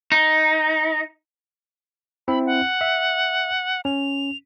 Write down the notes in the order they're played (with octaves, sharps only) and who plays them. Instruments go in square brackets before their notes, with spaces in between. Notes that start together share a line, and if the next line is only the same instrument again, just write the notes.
[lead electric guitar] D#4
[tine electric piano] C4 E4 E5 [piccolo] B5
[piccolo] F#5
[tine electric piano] E5
[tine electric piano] C#4 [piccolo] F7